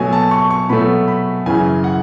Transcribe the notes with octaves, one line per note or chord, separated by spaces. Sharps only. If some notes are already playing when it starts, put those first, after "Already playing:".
Already playing: B2 F#3 A3 G#5
A5
C#6
C#6
B2 F#3 A3 B5
B5
F#2 C#3 E3 G#5
F#5